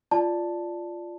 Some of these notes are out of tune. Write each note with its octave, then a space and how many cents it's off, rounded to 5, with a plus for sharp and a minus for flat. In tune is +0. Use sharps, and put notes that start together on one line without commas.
F4 -5 D5 +0 A5 +0